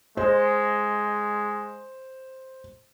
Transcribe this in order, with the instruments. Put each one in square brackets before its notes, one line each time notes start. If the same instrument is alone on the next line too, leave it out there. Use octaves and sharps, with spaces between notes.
[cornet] G#3 [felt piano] C5